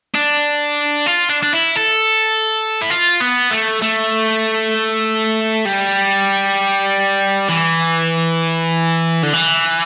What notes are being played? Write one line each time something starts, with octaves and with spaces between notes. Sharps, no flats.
D4
F4
D4
D4
E4
A4
E4
F4
B3
A3
A3
G3
E3
D3
E3